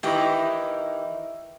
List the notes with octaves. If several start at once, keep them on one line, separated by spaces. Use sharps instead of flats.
D#3 E3 D#4 E4 G4 D#5